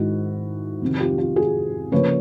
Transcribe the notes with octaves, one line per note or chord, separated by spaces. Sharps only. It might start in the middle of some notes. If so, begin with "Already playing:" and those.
Already playing: G#2 D#3 G#3 E4 F#4
F2 C3 D#3
F4 G4
F4 G4
F#4 G#4
C#3 F3 A#3 B4 C#5